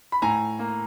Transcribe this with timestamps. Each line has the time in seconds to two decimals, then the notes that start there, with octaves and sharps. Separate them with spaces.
0.12 B5
0.22 A2 G#5 A#5
0.59 A#3